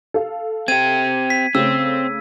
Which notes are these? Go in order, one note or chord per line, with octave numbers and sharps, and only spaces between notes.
A4 F5
C4 G4 G#6 D#7
B6
C#3 A3 C4 E6